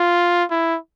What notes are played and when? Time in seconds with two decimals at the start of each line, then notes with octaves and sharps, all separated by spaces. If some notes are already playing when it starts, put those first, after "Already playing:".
Already playing: F4
0.50 E4